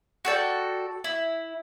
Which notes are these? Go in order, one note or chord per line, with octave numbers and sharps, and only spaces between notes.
F#4 A4 D5 G5
E4